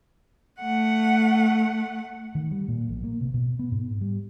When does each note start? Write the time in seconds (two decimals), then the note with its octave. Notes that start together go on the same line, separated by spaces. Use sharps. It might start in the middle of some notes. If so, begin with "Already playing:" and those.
0.60 A3 F#5
2.35 D#3
2.51 G3
2.68 A#2
2.89 A#1
3.04 A#3
3.21 C3
3.34 B2
3.59 B3
3.72 G#2
4.01 G3